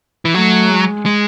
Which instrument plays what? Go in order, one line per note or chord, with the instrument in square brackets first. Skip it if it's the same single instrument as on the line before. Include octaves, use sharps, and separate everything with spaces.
[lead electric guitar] E3
[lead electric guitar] F#3 [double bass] A3
[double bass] G#3
[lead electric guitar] G#3